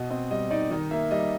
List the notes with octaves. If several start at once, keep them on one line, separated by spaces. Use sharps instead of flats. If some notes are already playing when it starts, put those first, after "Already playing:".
Already playing: B2 D#5
C4 D#5
G3 D#5
D#4 D5
D#3 D#5
A#3 E5
G3 D#5